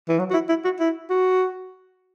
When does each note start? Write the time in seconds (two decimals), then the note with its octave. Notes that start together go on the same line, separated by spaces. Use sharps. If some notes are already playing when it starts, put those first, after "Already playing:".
0.09 E3
0.19 F#3
0.30 F#4
0.34 E4
0.49 E4
0.65 F#4
0.80 E4
1.10 F#4